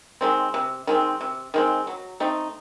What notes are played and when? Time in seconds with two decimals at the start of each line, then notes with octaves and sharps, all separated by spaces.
0.21 D#3 G#3 C4
0.54 C3
0.87 D#3 G#3 C4
1.21 C3
1.54 D#3 G#3 C4
1.87 F#3
2.20 A3 C4 D#4